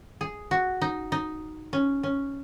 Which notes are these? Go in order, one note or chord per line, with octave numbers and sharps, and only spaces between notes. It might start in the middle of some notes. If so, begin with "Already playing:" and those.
G#4
F#4
D#4
D#4
C#4
C#4